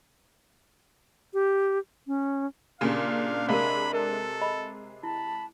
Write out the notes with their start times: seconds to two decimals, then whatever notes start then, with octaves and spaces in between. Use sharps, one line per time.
1.34 G4
2.07 C#4
2.81 A#2 C#3 D4 G4 F5 G#5
3.48 C3 G#3 A#4 F5 B5
3.93 A4 A#4
4.42 D#5 B5
5.03 E4 A5 B5